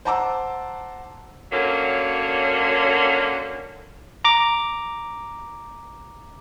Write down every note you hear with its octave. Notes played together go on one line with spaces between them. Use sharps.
C5 F#5 A5 A#5 D6 E6
D3 F#3 A#3 C#4
A#5 D6